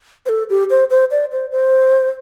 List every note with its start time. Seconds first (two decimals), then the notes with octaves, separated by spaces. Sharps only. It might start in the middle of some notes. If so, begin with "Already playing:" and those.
0.26 C5
0.29 A4
0.50 G4
0.70 C5
0.90 C5
1.11 D5
1.32 C5
1.51 C5